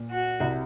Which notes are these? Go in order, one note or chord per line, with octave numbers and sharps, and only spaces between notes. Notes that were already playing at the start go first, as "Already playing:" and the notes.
Already playing: A#2
F#4
C2 C3